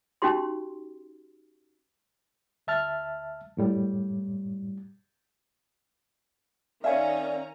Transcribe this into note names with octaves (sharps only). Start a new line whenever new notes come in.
C#4 D#4 F#4 G4 C6
D2 E5 A5 F6
F#2 A2 G3
D#3 C#4 C#5 D5 E5 F5 G#5 A#5